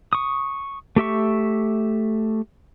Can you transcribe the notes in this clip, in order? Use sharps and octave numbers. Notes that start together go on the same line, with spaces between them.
C#6 D#6
A3 G4 E5 C#6